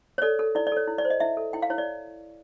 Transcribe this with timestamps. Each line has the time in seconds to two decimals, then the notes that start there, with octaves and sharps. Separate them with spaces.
0.18 C#5
0.22 A4 D5
0.39 A4
0.55 E4 D5
0.67 D5
0.72 A4 C#5
0.87 E4
0.98 D5
1.05 C5
1.10 D#5
1.20 E4 E5
1.37 A4
1.53 E4 G5
1.62 F5
1.70 E4 C#5
1.78 D5